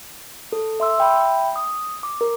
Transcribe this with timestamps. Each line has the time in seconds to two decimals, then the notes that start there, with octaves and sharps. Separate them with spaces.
0.52 A4
0.80 E5 C6 E6
0.98 E5 G5 B5
1.56 D#6
2.03 D6
2.21 A#4